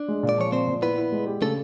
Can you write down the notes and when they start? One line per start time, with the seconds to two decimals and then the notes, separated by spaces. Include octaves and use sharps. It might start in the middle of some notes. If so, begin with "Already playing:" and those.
Already playing: D4
0.08 G#3
0.23 A#2
0.29 D5
0.38 F3 C#5
0.52 A#2 C4 C5
0.67 A#2
0.82 B3 E4 B4
0.98 E4
1.12 G#3
1.27 G4
1.42 C#3 A3 A4